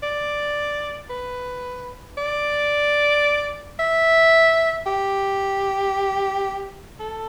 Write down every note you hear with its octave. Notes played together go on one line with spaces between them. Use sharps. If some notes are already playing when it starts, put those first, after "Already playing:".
D5
B4
D5
E5
G4
A4